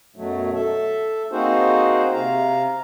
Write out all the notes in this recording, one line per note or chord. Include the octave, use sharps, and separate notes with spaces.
F#2 B2 F#3 A3
A4 E5
A#3 C4 D#4 F#4 G#4 C5
C3 F5 A#5